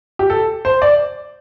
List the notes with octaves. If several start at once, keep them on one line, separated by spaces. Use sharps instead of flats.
G4
A4
C5
D5